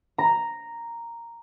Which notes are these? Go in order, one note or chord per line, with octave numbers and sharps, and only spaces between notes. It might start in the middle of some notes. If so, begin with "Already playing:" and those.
A#5